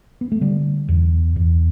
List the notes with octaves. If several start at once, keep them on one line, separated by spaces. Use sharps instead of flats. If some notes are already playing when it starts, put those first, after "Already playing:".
B3
A3
D3 G3
E2
E2